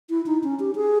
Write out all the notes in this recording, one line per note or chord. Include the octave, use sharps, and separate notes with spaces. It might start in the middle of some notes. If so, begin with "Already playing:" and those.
E4
D#4
C#4
G4
G#4